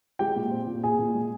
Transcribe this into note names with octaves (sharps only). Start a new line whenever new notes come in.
G#3 G4 G5
A#2
C4
A#2
A#2 G#4 G#5
A#2
G#3